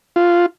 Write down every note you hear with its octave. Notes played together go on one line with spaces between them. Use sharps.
F4